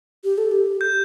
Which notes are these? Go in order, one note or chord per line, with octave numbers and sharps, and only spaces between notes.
G4
A4
G4
G6